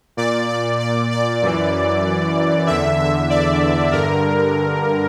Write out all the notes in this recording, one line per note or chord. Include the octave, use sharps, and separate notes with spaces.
A#2 D5
D5
D5
D5
F#2 E3
E2 D3 E5
E5
D5
G2 D3 A#4